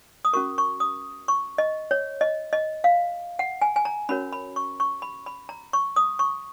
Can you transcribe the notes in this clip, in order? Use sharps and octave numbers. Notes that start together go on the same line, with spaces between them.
D#6
C#4 F#4 A#4 C#6
C#6
D#6
C#6
D#5
C#5
D#5
D#5
F5
F#5
G#5
G#5
A#5
C#4 F#4 A#4 C#5 B5
B5
C#6
C#6
B5
B5
A#5
C#6
D#6
C#6